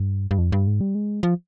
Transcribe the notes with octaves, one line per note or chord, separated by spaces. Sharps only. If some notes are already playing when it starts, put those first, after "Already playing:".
Already playing: G2
G2
F2
G2
G#2
G3
G#3
F3